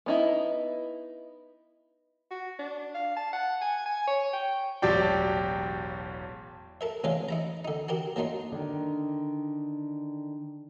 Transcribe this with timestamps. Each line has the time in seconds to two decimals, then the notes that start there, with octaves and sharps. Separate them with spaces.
0.06 B3 D#4 E4
2.31 F#4
2.59 D4
2.95 F5
3.16 A5
3.33 F#5
3.61 G#5
3.86 G#5
4.07 C#5
4.33 G5
4.82 E1 A1 F#3 G4 D5 G5
6.81 A4 A#4 E5
7.04 C2 E3 G#3 D4 C#5 F5
7.29 D#4 E4 A#5
7.65 D3 D#4
7.88 F#4 G4 A#4
8.16 F#3 A#3 D4 D#4 F4
8.52 D3 D#3